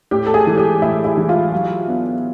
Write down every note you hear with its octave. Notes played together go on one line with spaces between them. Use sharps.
A2 G4
A4
G#4
E3 G#3
G4
A2 E4
E4
E3 G#3
F4
F#3
B3 D4